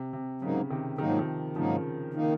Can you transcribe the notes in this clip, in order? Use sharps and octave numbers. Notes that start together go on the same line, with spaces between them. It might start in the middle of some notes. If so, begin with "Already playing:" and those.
Already playing: C3
C3
G#2 C#3 F#3 A#3 D#4
C3 D#3
G#2 D#3 F#3 A#3 D#4
F3
C3 D#3
G#2 C#3 F3 F#3 A#3 D#4
D#3 A#3 D#4